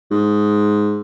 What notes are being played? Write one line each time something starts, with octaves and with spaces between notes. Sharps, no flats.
G#2